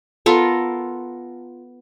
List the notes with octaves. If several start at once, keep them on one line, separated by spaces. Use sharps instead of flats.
B3 F4 A4 A#4